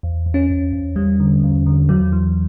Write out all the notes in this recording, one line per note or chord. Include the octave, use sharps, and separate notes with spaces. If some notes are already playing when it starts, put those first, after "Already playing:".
E2
E2
C#4
E2
E2
E2 G3
D3
E2
D3
E2 F#3
E3